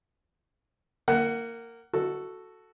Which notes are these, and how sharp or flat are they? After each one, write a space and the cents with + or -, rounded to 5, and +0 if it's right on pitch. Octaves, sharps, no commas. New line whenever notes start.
A#3 -15 F#5 +15
F#4 +0 A4 +0